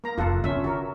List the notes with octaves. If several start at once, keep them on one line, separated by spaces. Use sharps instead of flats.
A#3 A#5
F1 F2 F4 A4 F#5
D3 C#4 F4 E5
F#4 A#4